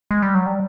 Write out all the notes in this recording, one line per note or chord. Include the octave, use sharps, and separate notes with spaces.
G#3
G3
F#3
G3